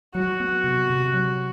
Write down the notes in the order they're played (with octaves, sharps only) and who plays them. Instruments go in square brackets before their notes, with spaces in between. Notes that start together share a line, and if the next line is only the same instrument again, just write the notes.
[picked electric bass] F#3 [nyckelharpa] F#4
[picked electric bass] B3
C3
C3
F#3